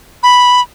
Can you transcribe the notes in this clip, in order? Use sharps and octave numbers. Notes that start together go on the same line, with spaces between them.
B5